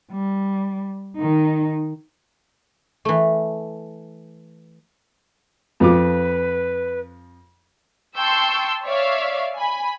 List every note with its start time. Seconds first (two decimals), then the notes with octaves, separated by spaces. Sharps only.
0.12 G3
1.17 D#3 D#4
3.05 E3 A3
5.80 F2 F3 B4 D6
8.17 G5 A5 C6 C#6 E6 G6
8.84 C#5 D5 E5 F5
9.57 G#5 B5